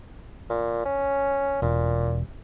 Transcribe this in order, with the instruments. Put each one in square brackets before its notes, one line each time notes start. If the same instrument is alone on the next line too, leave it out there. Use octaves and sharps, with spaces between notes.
[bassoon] A#2
C#4
[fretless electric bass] E1 [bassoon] A#2